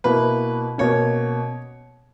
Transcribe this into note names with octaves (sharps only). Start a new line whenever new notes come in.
B2 A#3 E4 B4
B2 A#3 C#4 C#5